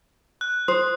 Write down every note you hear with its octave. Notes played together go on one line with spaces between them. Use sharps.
F#6
C5 D#6 F#6